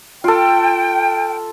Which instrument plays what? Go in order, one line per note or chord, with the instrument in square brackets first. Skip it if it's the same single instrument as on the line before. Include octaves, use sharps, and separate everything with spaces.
[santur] F4 A4 [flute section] G5